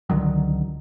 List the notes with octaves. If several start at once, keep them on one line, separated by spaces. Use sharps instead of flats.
C#2 D3 D#3 F#3